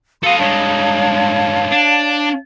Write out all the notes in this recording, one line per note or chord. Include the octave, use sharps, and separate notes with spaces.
F#4 A4 D#5 F5 C6
G2 G#3 C#5 F5 A5
D4